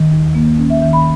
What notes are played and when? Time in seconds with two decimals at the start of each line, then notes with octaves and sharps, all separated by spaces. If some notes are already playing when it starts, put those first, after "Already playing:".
Already playing: D#3
0.11 D#2
0.35 A#3
0.58 C#4
0.70 E5
0.81 D#3 E5
0.93 B5